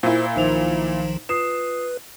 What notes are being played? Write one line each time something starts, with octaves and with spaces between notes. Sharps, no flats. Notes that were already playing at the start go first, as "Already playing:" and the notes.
A#2 E4 C5
B1 D#3 F3 D#4 C5 F7
F4 B4 D#6 C7 E7